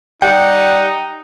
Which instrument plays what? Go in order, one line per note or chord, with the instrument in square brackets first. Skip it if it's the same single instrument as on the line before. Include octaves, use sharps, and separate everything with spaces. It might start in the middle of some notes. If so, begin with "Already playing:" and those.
[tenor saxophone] G3 [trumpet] D#4 [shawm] F#5 [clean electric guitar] G5